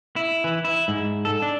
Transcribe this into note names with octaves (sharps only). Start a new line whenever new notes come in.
E4
E3
E4
G#2
A4
D4